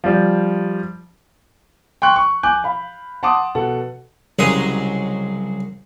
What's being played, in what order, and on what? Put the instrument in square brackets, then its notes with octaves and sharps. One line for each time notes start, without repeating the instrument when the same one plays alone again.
[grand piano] F3 G3
G5 C6 C#6 F#6
C#6
G#5 D6 F#6 G6
F5 B5
F#5 A5 C6 D6 D#6
B2 A4 F#5
[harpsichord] C2 C#3 F#3 G#3 A#5 D#6